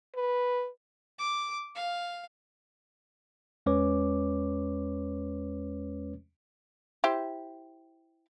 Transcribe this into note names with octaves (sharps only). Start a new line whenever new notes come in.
B4
D6
F5
E2 G#3 C#4 B4 C#5 D6
E4 G4 C5